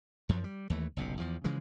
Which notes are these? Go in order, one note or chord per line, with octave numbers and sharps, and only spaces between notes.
F#2 F3 F#3
G3
D#2 E3 A3
F#1 B1 C3
E2 F3
C#3 E3 F3 G#3